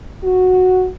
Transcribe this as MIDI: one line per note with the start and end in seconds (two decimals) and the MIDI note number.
0.24 0.87 66